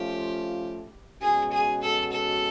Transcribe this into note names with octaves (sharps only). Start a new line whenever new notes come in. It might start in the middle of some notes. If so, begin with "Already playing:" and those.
Already playing: F3 A3 C#4 F4 G4
B2 G#3 C#4 F#4 G#4
G#4
A4
A4